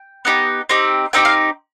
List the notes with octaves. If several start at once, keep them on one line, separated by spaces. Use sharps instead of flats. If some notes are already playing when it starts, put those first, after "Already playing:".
Already playing: G5
B3 D#4 G4
C4 D#4 G4
C4 D#4 G4 G5
F5